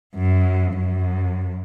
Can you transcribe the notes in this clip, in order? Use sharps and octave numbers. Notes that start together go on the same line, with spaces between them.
F#2
F#2